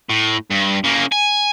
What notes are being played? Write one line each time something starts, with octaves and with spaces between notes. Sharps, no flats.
A2
G2
C#3 A#3
G#5